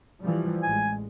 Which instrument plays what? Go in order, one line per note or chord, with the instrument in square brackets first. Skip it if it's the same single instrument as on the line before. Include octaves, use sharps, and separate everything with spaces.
[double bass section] E3 F3 G3
[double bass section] A1 G#3 [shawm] G#5